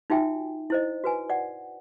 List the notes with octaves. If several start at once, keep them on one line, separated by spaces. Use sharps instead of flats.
D#4 F4 F#4 E5 G5 G#5
E4 C5 D#5
F#4 B4 G#5
D5 F#5